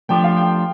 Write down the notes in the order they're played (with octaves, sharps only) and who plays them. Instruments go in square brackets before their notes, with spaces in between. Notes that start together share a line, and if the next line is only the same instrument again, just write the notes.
[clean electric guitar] F3 A3 D4 G4 [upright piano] G5
[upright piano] F5
G5